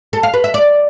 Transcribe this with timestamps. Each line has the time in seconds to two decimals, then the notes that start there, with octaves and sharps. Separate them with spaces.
0.13 A4
0.23 F5
0.34 B4
0.44 E5
0.54 D5